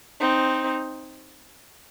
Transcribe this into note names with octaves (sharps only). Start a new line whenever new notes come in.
C4 D#4